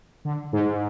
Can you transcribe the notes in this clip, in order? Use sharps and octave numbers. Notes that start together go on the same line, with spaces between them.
D3
G#2